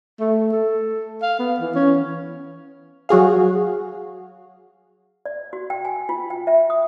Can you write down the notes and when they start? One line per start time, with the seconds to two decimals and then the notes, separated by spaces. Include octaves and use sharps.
0.20 A3
0.52 A4
1.22 F5
1.39 B3
1.60 E3
1.75 C#4
1.99 E3
3.09 F#3 F#4 G#4 F5
5.25 D5
5.53 F#4
5.70 G5
5.85 G#5
6.09 F4
6.30 G5
6.47 E5
6.70 D#6